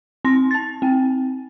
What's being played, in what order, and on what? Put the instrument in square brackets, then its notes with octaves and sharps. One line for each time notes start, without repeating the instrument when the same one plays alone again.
[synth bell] C4 C6 A#6
A5 A6
C4 G5